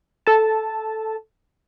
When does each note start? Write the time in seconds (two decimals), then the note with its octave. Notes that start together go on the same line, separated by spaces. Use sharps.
0.27 A4 A5